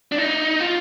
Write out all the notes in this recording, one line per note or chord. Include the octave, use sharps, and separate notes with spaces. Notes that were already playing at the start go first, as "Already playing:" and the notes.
D4
D#4
F4